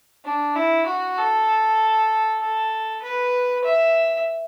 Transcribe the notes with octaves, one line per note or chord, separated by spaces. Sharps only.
D4
E4
F#4
A4
A4
B4
E5